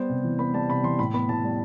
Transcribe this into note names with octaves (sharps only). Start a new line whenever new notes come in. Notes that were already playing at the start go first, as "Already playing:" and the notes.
Already playing: G3 B3 C5
C3
E3
B3 B5
G3 A5
C3 B5
E3 C6
A2 B5
B3 B5
A2 A5
G3